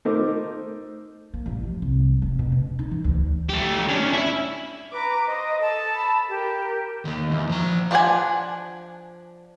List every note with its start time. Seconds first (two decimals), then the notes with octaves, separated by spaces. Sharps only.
0.05 A3 D#4 A#4 C5 D6
1.34 A#3
1.46 A1
1.63 F3
1.82 C2
2.22 F1
2.39 B2
2.52 C#3
2.79 D#4
2.91 E3
3.04 D2
3.50 A3 G4
3.89 C#4 D4
4.13 E4 E5
4.92 B4 A#5 D6
5.26 C5 D#5
5.62 A4 A5
5.94 B5
6.29 G4 A#4
7.05 D#3 A#3
7.31 E2
7.49 F3 A#5
7.91 F3 D4 D5 F#5 G#5